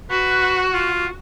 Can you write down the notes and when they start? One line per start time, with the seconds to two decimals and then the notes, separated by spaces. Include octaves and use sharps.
0.11 F#4 B4
0.74 F4